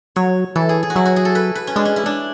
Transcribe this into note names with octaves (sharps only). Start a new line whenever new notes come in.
F#3 C#5
E3 A4
G#4
G#4
F#4
F#3 E4
F#4
G#4
A4
B4
B4
C#4
G#3 D4
C#4
E4
D4